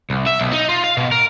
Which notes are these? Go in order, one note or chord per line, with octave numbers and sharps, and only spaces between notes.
C2
E5
B1
D#4
F4
F5
B2
A#4